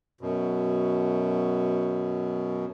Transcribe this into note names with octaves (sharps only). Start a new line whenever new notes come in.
F#2 B2